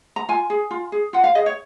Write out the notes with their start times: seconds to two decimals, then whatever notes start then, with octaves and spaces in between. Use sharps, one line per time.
0.16 A#5
0.29 F4 G#5
0.50 G#4
0.71 F4
0.92 G#4
1.13 F4 F#5
1.24 F5
1.35 G#4 D#5
1.46 C#5